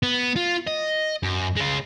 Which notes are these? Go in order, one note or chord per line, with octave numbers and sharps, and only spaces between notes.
B3
F4
D#5
F#2
G#3 F4